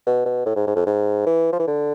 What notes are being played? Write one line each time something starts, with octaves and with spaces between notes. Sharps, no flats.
B2
B2
A2
G#2
G#2
F2
G#2
E3
F3
E3
D3